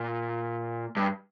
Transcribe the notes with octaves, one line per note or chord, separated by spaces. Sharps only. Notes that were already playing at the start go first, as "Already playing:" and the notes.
Already playing: A#2
G2